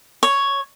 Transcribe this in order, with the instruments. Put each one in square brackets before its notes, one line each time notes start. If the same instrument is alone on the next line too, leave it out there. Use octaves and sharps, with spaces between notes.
[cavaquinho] C#5